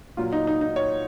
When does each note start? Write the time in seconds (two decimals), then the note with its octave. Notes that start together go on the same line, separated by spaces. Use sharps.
0.17 A#2 F#3 F4
0.33 D#4
0.47 D#4
0.61 D#4
0.76 C#5